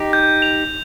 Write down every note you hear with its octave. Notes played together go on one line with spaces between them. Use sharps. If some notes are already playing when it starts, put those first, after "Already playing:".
Already playing: D#4 G4
G6
F7